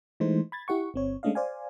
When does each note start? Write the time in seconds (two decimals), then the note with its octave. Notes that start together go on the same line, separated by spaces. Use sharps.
0.20 E3 G#3 A3 D#4 C5
0.52 B5 G#6 A6
0.68 E4 G4 F#5 C#6
0.94 G1 C4 C#5
1.23 G#3 A3 C#4 D4 D#5 F5
1.35 C5 D5 F5 G#5